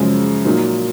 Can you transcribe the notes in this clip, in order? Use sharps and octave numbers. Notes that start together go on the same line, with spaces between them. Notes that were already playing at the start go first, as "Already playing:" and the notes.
Already playing: F#2 C#3 F3 G#3
A#2 F#3 A#3 D#4